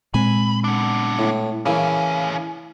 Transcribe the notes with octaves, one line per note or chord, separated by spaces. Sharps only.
A#2 G#3 C4 G#5 B5
B3 D4
A2
A2 C#3 E3 A#3 C#4